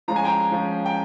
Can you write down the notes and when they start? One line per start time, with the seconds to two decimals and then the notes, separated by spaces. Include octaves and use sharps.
0.08 F3 G#3 C#4 A#5
0.16 G#5
0.24 G5 A#5
0.51 F3 G#3 C#4
0.86 G5